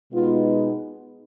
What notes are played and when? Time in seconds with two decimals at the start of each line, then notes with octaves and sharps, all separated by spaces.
0.12 B2 G#3 B3 D#4 F4